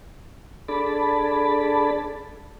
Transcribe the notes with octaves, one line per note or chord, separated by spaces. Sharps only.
D4 G#4 A4 D5 A5 B5